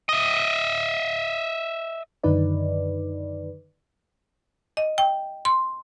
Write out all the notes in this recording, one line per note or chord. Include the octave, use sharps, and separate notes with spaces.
D#5 E5
F#2 D3 D#3 D#4 B4 D5
D#5
G5
C6